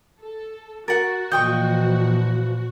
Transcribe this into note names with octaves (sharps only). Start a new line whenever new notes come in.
A4
F#4 A#4 F#5 A6
A#2 E3 F3 D#5 G5 C#6 G6